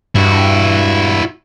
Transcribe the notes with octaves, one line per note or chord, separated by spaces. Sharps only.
G2 E4 F#4